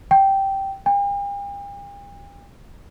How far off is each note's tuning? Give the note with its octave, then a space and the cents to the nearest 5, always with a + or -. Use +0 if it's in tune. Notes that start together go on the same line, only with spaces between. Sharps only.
G5 -10
G5 +45